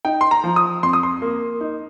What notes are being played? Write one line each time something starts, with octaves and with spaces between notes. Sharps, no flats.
D#4 G5
C6
A#5
F3
D#6
F2 C6
D#6
C6
A#3
D#4